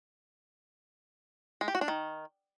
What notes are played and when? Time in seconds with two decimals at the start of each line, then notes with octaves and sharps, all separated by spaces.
1.61 G#3
1.68 G4
1.75 F#4
1.81 D4
1.88 D#3